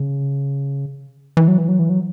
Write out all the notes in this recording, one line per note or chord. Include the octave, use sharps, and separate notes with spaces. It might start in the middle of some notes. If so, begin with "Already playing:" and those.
Already playing: C#3
E3
F#3
E3
F#3
E3
F#3